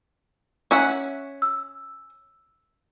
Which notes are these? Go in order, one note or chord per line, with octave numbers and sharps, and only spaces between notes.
C#4 E5 F#5
E6